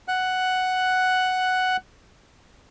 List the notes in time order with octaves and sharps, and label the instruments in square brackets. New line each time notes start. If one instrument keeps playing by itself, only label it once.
[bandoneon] F#5 F#6